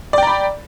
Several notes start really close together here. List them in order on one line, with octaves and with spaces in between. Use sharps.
D5 G5 A#5 B5